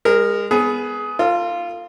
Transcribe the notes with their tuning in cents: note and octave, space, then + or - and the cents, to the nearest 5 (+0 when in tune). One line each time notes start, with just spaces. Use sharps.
G#3 -30 A#4 +0
B3 +0 G#4 +15
F4 -5 A4 +45